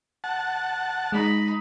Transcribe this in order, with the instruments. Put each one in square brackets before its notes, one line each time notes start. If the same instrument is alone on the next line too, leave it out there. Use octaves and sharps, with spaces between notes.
[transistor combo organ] F#5 A5
[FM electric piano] G#3 [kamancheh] D#4 B5